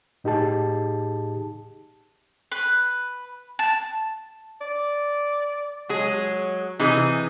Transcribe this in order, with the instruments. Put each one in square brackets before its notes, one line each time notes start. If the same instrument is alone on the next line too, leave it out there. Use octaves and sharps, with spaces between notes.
[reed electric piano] A2 D#4 G4 G#4 A5
[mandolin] B4
A5
[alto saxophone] D5
[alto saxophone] F#3 [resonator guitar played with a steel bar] G#3 G#4
[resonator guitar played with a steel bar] C3 E3 G#4 [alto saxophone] D#4